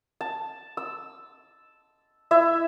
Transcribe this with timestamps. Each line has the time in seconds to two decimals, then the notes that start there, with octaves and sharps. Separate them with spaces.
0.21 A5
0.77 E6
2.31 E4 E5